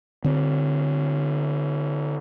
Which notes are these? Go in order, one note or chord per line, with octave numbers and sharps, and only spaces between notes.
D3 C4